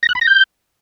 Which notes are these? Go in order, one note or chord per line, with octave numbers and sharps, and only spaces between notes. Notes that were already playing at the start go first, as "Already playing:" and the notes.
A#6
F#6
B5
A#6
G6